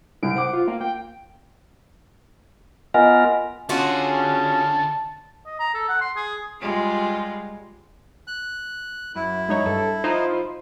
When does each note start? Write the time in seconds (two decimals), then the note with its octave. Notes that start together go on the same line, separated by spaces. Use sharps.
0.23 C2 D7
0.35 C5 F#5 D6
0.53 F4
0.68 A#3 F5
0.81 G5
2.94 B3 F4 A#4 D#5 F#5 G#5
3.69 D3 C#4 F4 F#4 G#4 A5
5.46 D#5
5.60 A#5
5.75 A4
5.89 F#5
6.01 C6
6.16 G#4
6.61 G3 G#3 F4
8.27 F#6
9.15 F#2 E4
9.49 G#3 D#4 C#5
9.66 G2 A4
10.04 D#4 F4 C5